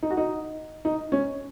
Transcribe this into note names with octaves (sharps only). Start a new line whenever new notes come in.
D#4
F#4
D#4
D#4
C#4